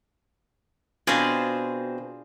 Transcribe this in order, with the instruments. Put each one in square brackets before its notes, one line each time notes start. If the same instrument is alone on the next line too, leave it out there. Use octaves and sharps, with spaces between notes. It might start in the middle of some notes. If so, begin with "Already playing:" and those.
[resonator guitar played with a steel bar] B2 C4 [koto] D4 F4 G#4